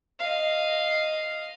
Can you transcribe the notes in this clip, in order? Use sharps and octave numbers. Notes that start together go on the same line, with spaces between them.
D#5 F5